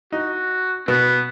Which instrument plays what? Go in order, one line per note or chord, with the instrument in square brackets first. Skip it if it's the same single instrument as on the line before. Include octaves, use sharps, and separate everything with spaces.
[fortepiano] D#4 [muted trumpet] F#4
[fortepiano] B2 [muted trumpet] B3